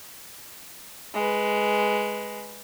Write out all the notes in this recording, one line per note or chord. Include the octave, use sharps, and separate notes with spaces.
G#3 B4